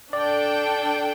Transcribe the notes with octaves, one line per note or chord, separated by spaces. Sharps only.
D4 A4 D5 G5